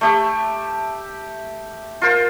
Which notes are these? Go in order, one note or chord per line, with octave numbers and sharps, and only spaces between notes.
A3 G4 E5
F4 A#4 C5